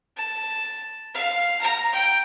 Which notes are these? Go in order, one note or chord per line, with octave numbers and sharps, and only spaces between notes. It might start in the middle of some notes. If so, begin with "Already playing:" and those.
A5
F5
A#5
G5